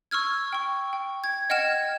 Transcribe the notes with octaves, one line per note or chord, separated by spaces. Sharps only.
C#6 E6 F6 G#6
G5 C#6
G5
G#6
D#5 F#5 G5 F6 G#6 E7